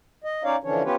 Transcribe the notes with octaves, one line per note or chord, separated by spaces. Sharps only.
D#5
C#4 D#4 C#5 D5 F5
D3 E3 F3 C#4 D4 C#5
B3 C#4 F4 G4 B4 C#5